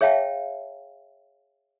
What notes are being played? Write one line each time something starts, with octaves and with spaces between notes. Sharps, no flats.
G#4 C#5 E5 F5 G5 A5